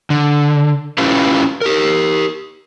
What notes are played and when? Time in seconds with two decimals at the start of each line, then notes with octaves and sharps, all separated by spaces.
0.10 D3
0.98 C#4 E4 F4 G4 B4
1.61 G4 A#4